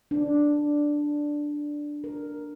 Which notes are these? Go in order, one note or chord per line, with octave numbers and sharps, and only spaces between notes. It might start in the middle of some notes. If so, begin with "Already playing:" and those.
D4
A#4